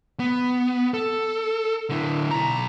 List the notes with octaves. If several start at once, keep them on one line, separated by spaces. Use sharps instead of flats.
B3
A4
D3 E4
B1 A#5